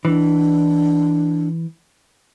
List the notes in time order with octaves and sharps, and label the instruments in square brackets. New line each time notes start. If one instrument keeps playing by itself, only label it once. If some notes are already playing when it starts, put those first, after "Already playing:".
[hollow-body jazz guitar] E3 [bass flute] D4